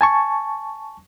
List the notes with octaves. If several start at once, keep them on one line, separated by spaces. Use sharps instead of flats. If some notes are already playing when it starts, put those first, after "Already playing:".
G#5 A5 C#6